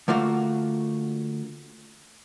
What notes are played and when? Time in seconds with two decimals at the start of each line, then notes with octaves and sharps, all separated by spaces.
0.08 D3 A3 A#3 F4 F#4